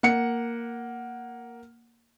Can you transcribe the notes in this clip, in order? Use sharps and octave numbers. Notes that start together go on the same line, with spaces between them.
A#3 F#5 C#7